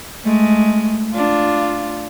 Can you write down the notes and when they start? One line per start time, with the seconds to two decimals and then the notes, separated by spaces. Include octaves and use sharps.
0.24 G#3 A3
1.13 D4 F4